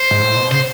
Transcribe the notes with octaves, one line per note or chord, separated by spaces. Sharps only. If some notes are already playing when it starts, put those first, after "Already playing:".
Already playing: C5
G#2
A2
B2
C#3 C5